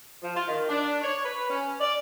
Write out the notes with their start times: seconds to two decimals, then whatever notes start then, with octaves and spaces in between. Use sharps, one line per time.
0.22 F3
0.36 F4
0.48 D#3
0.69 D4
1.02 C#5
1.24 B4
1.50 C#4
1.80 D5